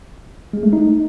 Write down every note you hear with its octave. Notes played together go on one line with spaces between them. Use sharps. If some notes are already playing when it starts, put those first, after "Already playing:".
G#3
A3
D#4